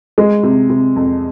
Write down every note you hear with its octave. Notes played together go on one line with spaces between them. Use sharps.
G#3
C3
C3
F2